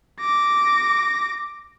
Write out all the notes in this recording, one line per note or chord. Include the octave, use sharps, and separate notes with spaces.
D6 A#6